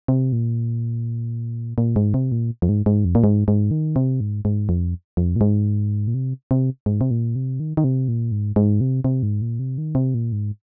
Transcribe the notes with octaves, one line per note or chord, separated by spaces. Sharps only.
C3
A#2
A#2
G#2
C3
A#2
F2
G#2
G#2
F2
A#2
G#2
G#2
D#3
C3
G#2
G#2
F2
F2
A#2
G#2
A#2
C3
C3
G#2
C3
A#2
C3
D#3
D#3
C3
A#2
G#2
G#2
C3
C3
G#2
A#2
C3
D#3
C3
A#2
G#2